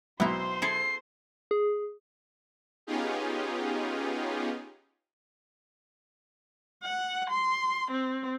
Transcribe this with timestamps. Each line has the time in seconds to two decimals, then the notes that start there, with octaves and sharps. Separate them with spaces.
0.20 B1 B3 E4 C5 E5 A#5 C6
0.62 E4 G#4 A4 C7
1.51 G#4
2.87 B3 C#4 D#4 F4 G4 G#4
6.84 F#5
7.30 C6
7.91 C4